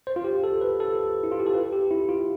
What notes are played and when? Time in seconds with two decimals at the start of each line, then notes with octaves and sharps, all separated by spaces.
0.07 C5
0.16 F4
0.24 G4
0.44 A4
0.61 B4
0.80 A4
1.23 E4
1.32 F4
1.40 G4
1.46 A4
1.54 B4
1.73 G4
1.91 E4
2.09 F4